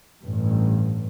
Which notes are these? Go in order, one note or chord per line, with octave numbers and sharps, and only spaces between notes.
A1 G2